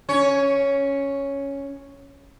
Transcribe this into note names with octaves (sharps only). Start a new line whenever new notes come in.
C#4 C#5